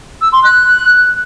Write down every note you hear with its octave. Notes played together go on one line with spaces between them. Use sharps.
E6
C6
F#6